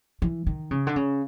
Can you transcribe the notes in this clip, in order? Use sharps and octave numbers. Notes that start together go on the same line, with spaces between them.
E3
D#3
C#3
D3
C#3